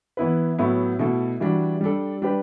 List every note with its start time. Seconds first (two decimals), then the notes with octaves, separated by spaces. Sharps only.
0.17 E3 B3 E4 B4
0.59 A2 F#3 B3 E4
0.99 B2 A3 E4 A4
1.40 E3 G3 D4 F#4
1.81 G3 D4 A4
2.22 G3 D4 G4 B4